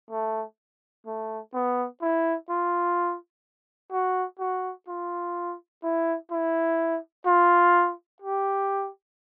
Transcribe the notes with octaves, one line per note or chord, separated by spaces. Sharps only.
A3
A3
B3
E4
F4
F#4
F#4
F4
E4
E4
F4
G4